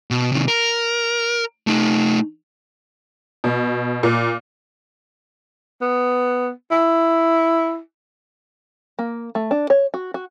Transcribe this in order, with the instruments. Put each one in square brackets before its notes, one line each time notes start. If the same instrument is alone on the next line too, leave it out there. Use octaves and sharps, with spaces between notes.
[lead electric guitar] B2
C3 D#3
A#4
A3 D#4
[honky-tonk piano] B2
A#2
[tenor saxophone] B3
E4
[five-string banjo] A#3
A3
D4
C#5
F#4
F#4